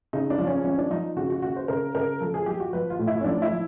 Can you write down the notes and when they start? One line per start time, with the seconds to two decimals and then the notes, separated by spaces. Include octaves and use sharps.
0.13 C#3 D#4
0.30 D4
0.38 F3
0.47 C#4
0.64 F3 C#4
0.78 D4
0.90 F3 D#4
1.17 C#3 F#4
1.30 F#4
1.42 C#3 F#4
1.56 C5
1.68 C#3 A#4
1.95 C#3 A#4
2.20 F3 A4
2.34 G#4
2.46 F3 G4
2.60 F#4
2.73 F3 B4
2.90 F4
2.99 A2
3.07 E4
3.21 C#4
3.24 F3 D4
3.42 E4
3.50 F3